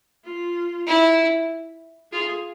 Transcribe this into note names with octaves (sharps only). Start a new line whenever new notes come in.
F4
E4
F4 G#4